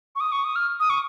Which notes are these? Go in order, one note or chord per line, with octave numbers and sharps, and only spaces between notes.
C#6
D#6
C#6
D#6
F6
D#6
C#6